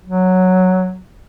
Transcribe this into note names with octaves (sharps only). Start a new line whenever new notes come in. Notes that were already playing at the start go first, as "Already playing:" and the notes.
F#3